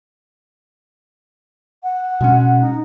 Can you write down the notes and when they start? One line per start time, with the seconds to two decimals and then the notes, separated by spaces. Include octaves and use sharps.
1.83 F#5
2.21 B2 G#3 C#4
2.61 D#4